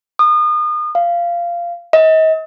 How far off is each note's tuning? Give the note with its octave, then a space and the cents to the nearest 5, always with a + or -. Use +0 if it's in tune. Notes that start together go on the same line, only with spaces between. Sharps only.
D#6 -35
F5 -15
D#5 +40